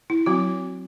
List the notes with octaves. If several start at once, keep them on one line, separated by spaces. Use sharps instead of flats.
E4
F#3 C4 F#4